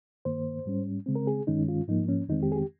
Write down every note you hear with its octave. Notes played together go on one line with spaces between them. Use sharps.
G2 D#3 A#3 C5
G#2 G3 C#4
C#3 G#3 C4
A#4
G#4
G2 D#3 G#3 C#4 D#4
F4
G#2 F3 A#3 D#4
C#4
F2 D#3 G#3 C4 D#4
G4
G#4
G4